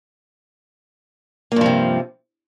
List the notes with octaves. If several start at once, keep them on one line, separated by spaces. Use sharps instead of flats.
G2 C3 F3 A#3